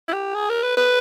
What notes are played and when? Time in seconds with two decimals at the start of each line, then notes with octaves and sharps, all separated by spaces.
0.08 E4
0.13 G4
0.35 G#4
0.49 A#4
0.63 B4
0.77 B4